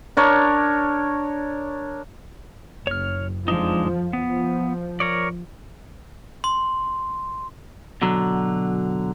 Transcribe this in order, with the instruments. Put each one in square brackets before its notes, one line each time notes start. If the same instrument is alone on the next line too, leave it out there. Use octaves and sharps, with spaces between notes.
[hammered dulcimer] D4 A#4 C#5
[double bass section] F#1 [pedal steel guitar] C#5 F6
[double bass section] F2 F3 [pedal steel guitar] G#3 D4 D#4
[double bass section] F3 [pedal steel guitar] B3
[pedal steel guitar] A#4 C#5 D5
[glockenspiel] C6
[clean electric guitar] B2 D3 F#3